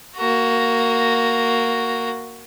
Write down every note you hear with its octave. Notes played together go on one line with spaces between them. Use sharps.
A#3 F#4